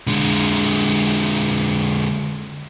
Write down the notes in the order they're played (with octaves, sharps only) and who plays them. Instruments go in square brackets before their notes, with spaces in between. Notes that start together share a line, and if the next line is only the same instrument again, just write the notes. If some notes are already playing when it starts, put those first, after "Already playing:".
[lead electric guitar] D3 G#3